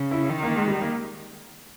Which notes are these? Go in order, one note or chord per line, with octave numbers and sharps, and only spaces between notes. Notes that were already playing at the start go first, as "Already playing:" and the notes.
Already playing: C#3
E4
D#3
A#3
G#3
G3
A#3